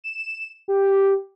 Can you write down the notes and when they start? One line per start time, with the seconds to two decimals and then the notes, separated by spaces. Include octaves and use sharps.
0.04 E7
0.68 G4